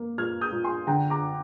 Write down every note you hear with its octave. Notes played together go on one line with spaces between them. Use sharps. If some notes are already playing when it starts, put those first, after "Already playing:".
Already playing: A#3
A#2 F6 G#6
D#6 G6
A#2
G#5 C6
D3 G5 A#5
A#5 D6